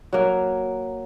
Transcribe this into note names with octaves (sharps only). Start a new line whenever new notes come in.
F#3 A#3